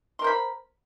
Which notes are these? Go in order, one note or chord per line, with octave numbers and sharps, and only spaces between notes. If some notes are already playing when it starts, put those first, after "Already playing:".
A#4 C5 B5 C6